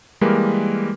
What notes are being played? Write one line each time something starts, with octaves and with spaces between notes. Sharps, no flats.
E3 G3 G#3 A#3 A#4 B4